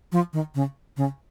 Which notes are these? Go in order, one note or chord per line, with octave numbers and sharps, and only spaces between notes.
F3
D#3
C#3
C#3